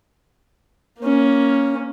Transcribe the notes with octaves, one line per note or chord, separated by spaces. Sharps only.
A#3 C#4